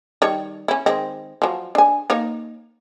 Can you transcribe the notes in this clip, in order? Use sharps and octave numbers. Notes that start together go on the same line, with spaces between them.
D#3 G3 C#5
C#4 E4
D#3 G#3 C4
F3 F#3
D4 G#5
A#3 D#4 C#5